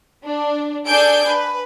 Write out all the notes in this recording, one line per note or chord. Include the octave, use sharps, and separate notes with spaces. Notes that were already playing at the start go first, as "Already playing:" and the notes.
D4
D4 G#4 A4 G#5 G6 D7
B4